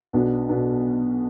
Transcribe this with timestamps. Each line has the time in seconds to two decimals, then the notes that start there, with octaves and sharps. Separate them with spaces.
0.13 B1 B2 B3 D4
0.49 B2 B3 D4